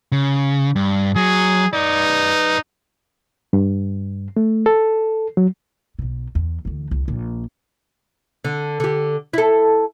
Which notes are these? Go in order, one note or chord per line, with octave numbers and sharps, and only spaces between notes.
C#3
G2
F#3 G#4
D#4 B4 D5
G2
A3
A4
F#3
B1 B2
E2
D2 E3
C2
A#1
D3
D3 G4
E4 A4